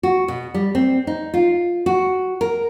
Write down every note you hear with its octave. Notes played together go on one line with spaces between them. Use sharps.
F#4
B2
G3
C4
D#4
F4
F#4
A#4